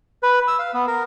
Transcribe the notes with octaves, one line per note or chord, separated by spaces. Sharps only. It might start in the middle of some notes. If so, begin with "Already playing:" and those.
B4
E6
F5
B3
A#4